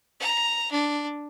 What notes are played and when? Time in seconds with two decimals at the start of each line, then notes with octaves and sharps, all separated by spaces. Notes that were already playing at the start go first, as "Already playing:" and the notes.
0.20 A#5
0.72 D4